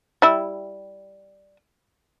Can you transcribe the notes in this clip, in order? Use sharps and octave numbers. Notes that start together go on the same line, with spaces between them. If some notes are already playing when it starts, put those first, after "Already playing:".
G3 E4